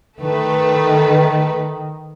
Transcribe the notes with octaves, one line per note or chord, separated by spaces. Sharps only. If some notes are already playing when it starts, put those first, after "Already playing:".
D#3 A3 B4